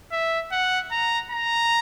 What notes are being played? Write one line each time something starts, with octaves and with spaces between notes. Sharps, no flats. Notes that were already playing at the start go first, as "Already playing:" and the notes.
E5
F#5
A#5
A#5